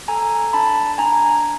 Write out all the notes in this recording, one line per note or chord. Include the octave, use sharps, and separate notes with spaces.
A4 G#5 A#5
D4 A5 B5
D4 G#5 A#5